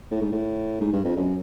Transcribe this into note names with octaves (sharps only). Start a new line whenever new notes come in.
A2
G#2
A2
G#2
G2
F2
F#2